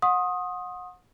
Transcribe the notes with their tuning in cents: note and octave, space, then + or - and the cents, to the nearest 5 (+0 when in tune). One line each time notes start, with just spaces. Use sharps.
F#5 -30 C6 +40 D#6 +5